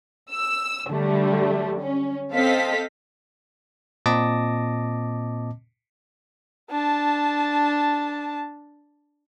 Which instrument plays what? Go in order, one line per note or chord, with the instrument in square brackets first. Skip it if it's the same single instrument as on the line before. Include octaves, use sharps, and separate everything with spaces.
[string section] E6
D3 F#3 G3 A3
C#4
C4 A4 D#5 F5 B6
[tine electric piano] A#2 C4 D#5 A5 D6 A#6
[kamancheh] D4 A5